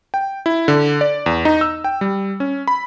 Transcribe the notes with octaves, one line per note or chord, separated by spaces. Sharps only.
G5
E4
D3
D5
E2
D#4
E6
G5
G3
C#4
B5